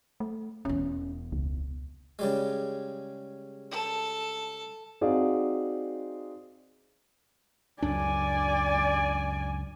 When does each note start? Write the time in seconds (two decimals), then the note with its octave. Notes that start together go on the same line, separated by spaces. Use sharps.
0.20 A3
0.65 E1 E2 C#4
1.32 C#2
2.19 C#3 G3 G#3
3.71 A4
5.01 C4 D#4 F#4 G#4 D5 F5
7.82 C#2 F#2 D4 D5 G#5